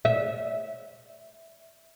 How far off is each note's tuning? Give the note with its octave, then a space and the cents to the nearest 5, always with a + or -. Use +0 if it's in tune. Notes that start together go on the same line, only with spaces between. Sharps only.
E5 -15